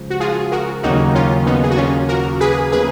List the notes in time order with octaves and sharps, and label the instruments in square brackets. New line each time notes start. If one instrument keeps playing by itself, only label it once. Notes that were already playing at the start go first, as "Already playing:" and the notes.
Already playing: [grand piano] C#2 C#3 F3
[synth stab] F#4
F4 G#4
F#4 A#4
[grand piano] D#2 C#3 F#3 A#3 [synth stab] D#4 F#4
[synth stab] C#4 F4
B3 D#4
G#4
F#4
C#4 F4
F#4 A#4
G#4 B4
[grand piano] C#3 F3 A#3 F4 [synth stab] G#4 B4